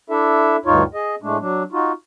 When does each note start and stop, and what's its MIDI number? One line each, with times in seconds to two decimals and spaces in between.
0.10 0.57 62
0.10 0.57 64
0.10 0.57 69
0.10 0.57 76
0.66 0.83 38
0.66 0.83 43
0.66 0.83 63
0.66 0.83 65
0.66 0.83 73
0.94 1.15 68
0.94 1.15 75
1.22 1.37 45
1.22 1.37 56
1.22 1.37 57
1.22 1.37 62
1.40 1.63 54
1.40 1.63 62
1.72 1.92 63
1.72 1.92 65
1.72 1.92 66